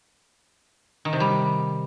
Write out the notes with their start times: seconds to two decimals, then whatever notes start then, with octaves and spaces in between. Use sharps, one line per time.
1.05 D#3
1.13 C3
1.20 G3